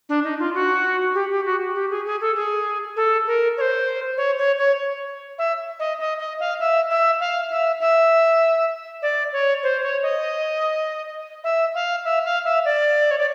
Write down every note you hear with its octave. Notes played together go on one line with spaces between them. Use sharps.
D4
D#4
F4
F#4
G4
G4
F#4
G4
G#4
G#4
A4
G#4
A4
A#4
C#5
C5
C#5
C#5
C#5
E5
D#5
D#5
D#5
F5
E5
E5
F5
E5
E5
D5
C#5
C5
C#5
D#5
E5
F5
E5
F5
E5
D5
C#5
D5